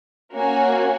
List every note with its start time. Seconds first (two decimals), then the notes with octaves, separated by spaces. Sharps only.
0.33 A#3 C#4 F#4 C#5 G#5